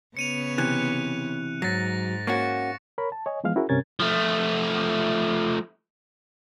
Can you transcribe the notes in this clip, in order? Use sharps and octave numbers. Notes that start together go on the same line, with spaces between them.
C#3 B3 C#5 C#7 D#7 F7
C3 E3 F#6
G#2 F#3 A6 A#6
A#3 C#4 F#4 C#6 C#7
A#4 C#5 B5
A5
C#5 D#5 G#5
E3 F3 G#3 B3 F5 F6
C#4 E4 F#4 G#4 A#4
G2 C3 C#4 A#4 G#6 A6
F3 A3